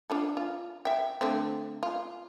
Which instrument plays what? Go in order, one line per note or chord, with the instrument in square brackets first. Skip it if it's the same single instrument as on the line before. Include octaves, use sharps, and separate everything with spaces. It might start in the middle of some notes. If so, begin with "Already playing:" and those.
[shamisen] D4 F4 A4
F4
E5 G5
D3 A3 C4
F4